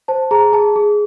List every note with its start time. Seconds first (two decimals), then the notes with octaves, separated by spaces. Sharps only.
0.08 C5 A5
0.31 G#4 A#5
0.53 G#4 A5
0.76 G#4